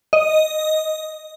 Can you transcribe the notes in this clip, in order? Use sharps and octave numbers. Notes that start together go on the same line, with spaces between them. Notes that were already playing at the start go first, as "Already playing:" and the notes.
D#5